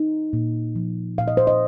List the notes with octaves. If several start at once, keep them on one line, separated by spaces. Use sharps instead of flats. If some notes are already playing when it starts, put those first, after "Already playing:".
Already playing: D#4
A#2
F3
A#2 F5
D#5
C5
D#5